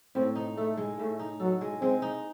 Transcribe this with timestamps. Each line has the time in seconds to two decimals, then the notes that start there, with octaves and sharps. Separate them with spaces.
0.15 A2 C4
0.35 D#4
0.57 A3 A4
0.77 G#3
0.99 A2 A3
1.19 D#4
1.40 F#3 A4
1.61 G#3
1.81 G#3 C4
2.02 D#4